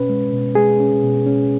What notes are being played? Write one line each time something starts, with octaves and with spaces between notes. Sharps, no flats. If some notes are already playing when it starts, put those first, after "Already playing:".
Already playing: B2 C#4 B4
G#3
B2
G#3 G#4
C#4
B2
C#4